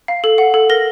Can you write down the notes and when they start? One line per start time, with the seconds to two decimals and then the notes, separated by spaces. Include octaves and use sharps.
0.08 F5
0.24 A4
0.38 F#5
0.54 A4
0.70 A#4 A#6